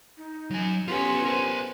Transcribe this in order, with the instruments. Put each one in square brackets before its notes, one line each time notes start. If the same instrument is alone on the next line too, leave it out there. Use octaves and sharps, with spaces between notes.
[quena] D#4
[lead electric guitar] F#3 G#5
[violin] B3 C#4 [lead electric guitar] F4 G4 [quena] C6
[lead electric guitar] A#4 C5